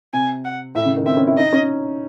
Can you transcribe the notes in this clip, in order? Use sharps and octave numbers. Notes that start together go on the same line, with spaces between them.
C3 G#5
F#5
A2 E5
C#3
D#3
C4 E5
C#4
E4
D#4 D#5
C#4